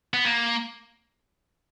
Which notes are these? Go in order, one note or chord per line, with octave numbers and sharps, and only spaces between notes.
B3
A#3